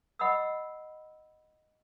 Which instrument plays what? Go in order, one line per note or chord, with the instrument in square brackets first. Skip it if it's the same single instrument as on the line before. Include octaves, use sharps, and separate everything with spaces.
[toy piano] D#5 F#5 B5 C#6 D#6 E6